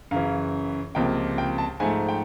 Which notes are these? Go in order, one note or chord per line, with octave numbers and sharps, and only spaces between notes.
F#2 C#3 E3 F5
C#2 C3 F3 A#3 G5
G5
A5
G#2 F3 A3 G#5
G5